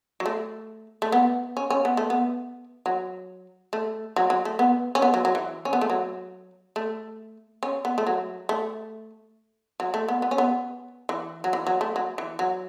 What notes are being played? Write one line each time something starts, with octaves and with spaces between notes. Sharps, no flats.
F#3
A3
A3
B3
C#4
C#4
B3
A3
B3
F#3
A3
F#3
F#3
A3
B3
C#4
B3
F#3
F#3
E3
C#4
B3
A3
F#3
A3
C#4
B3
A3
F#3
A3
F#3
A3
B3
B3
C#4
B3
E3
F#3
E3
F#3
A3
F#3
E3
F#3